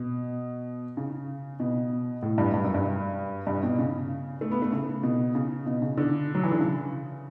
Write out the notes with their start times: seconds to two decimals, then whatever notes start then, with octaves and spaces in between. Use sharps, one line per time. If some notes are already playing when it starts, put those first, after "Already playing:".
Already playing: B2
0.97 C#3
1.60 B2
2.23 A2
2.38 G2
2.54 G2
2.64 F#2
2.74 G2
3.47 G2
3.63 B2
3.78 C#3
4.41 A3
4.51 B3
4.62 A3
4.72 C#3
5.03 B2
5.35 C#3
5.66 B2
5.82 C#3
5.97 D3
6.35 F#3
6.43 E3
6.51 D3
6.60 C#3